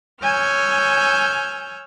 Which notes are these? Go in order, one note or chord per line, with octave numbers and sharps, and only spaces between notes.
C#5 G#5 E6 F6 G6